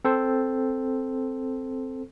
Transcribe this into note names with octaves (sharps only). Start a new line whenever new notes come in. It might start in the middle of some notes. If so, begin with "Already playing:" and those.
C4 A4 C5